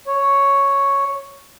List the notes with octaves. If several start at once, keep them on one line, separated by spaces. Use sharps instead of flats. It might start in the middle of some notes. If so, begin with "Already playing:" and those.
C#5